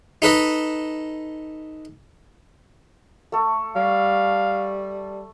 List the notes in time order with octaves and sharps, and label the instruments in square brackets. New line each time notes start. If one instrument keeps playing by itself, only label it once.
[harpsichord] D#4 A4 B4 D#5
[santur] A3 A4
[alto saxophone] G3 [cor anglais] F5